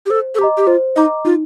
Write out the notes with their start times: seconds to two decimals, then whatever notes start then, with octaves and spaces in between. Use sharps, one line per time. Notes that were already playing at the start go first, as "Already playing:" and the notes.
0.06 G4
0.10 A4 C5
0.35 A4
0.39 G4 D#5 A#5 D6
0.57 G4
0.67 F4 C5
0.96 D#4 D#5 A#5 D6
1.25 D#4 F4